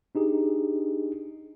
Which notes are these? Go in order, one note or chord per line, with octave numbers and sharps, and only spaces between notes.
D4 D#4 G4 G#4